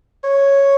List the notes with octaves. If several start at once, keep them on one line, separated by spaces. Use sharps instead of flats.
C#5